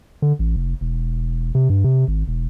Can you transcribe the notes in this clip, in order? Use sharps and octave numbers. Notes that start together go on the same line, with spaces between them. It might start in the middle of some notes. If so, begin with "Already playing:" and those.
D3
A1
F1
E1
C3
G2
C3
G#1
E1